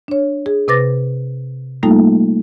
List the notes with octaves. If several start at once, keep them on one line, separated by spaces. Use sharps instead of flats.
D4 C#5
G#4
C3 B4 D6 A6 A#6
G3 A3 A#3 D#4 F4 A4